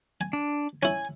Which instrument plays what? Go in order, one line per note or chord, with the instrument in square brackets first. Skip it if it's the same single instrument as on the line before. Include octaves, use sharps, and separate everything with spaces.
[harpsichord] G#5
[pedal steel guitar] D4
[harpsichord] C#4 E4 [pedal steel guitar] G#5